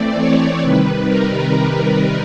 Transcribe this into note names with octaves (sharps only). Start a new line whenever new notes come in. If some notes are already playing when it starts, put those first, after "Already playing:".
Already playing: E3 A3 C4 D5
C#5
C3 D#3 G3 B4
A#4